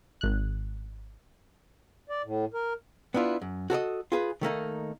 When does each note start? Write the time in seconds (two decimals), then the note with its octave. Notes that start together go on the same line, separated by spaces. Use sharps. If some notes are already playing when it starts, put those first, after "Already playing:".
0.21 G#1 F#6
2.09 D5
2.25 A2
2.54 A#4
3.14 B3 D4 E4 F4
3.42 F#2
3.70 F#4 A4 C#5 D#5
4.12 F4 G#4 B4
4.41 D#3 A3 A#3 D#4